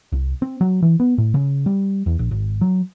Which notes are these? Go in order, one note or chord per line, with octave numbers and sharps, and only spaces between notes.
C2
C4
F#3
E3
B3
A2
C#3
G3
E2
A#1
G#1
F#3